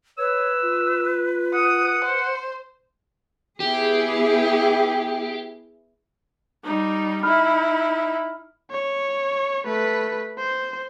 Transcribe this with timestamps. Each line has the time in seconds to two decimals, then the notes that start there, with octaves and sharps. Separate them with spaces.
0.18 B4 C#5 E6
0.63 F4
1.54 F#5 D#6
2.04 C5
3.60 B3 E4 G4 G#4
6.64 G3 D#4
7.23 D#4 E4 B5 F6
8.71 C#5
9.66 A3 B4
10.38 C5